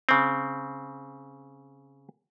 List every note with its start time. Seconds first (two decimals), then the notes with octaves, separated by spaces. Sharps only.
0.09 C#3 C4